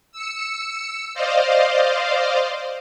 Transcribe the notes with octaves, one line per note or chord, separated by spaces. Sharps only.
E6 C#7
C5 D5 D#5 F5